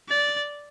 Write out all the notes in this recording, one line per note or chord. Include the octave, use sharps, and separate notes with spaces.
D5